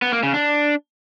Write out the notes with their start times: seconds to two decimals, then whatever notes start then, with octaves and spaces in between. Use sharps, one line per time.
0.02 B3
0.13 A#3
0.23 C#3
0.34 D4